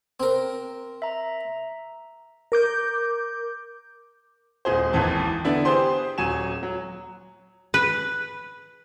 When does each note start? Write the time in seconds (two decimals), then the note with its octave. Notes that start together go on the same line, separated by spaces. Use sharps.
0.20 C4 A#4
1.02 E5 A#5
2.52 A#4 D6 G6
4.65 D#1 G#3 G#4 C5
4.93 G#1 D#2 E3 A5
5.45 D3 B3 D4 E4
5.65 G4 G#4 B4 C5 C6
6.18 D#1 F#3 C#5 G#5 E7
6.63 F#3
7.74 B4